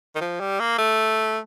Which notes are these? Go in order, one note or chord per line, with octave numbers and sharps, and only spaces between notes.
D#3
F3
G3
A#3
A3